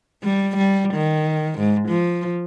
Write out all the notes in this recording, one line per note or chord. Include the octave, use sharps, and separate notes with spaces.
G3
G3
D#3
G#2
F3